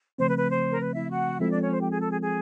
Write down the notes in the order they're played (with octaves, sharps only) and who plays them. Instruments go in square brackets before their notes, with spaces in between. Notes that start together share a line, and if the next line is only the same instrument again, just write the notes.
[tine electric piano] C#3 F3 A3 C4 [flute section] C5
[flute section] B4
B4
C5
A#4
B4
E4 E5
F#4 F#5
[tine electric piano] F3 G#3 C4 F4 A4 [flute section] E4 E5
[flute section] D4 D5
C#4 C#5
C5
G4
G#4
A4
G#4
G#4